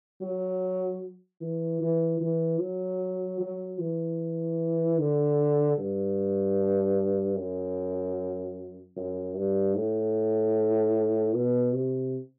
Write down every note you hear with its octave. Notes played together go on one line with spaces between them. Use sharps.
F#3
E3
E3
E3
F#3
F#3
E3
D3
G2
F#2
F#2
G2
A2
B2
C3